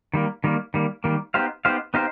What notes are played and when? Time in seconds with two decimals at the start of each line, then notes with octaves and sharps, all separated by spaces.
0.14 D#3 G3 A#3
0.44 D#3 G3 A#3
0.74 D#3 G3 A#3
1.04 D#3 G3 A#3
1.34 B3 D#4 G4 C5 F5
1.65 B3 D#4 G4 C5 F5
1.94 B3 D#4 G4 C5 F5